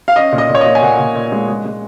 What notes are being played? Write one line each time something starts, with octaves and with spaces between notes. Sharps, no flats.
F5
C#4 D#5
A#2
D#5
A#2
C#5
A#2 D#5
G#5
A#2 F#5
A#2
A#2
G#3
G#3
G#3